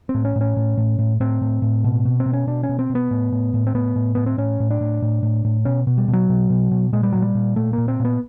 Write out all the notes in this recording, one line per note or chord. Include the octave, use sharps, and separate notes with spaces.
C4
A2
C#4
A2
C#4
A2
A2
A2
A2 C4
A2
A2
B2
B2
C4
B2
C#4
B2 D4
C#4
B2
C4
B2
B3
A2
A2
A2
C4
A2 B3
A2
A2 B3
C4
A2 C#4
A2
D4
A2
A2
A2
A2
B2 C#4
B2
G3
B2
F#3
B2
B2
B2
A#2 G#3
G3
A#2 F#3
G3
A#2
A#2 A3
A#2 A#3
C4
A#2
B3